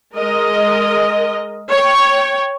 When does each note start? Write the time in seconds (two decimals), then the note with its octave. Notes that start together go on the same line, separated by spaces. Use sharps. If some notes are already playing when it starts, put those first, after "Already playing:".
0.17 G#3 A#4 D#5
1.71 C#5 G5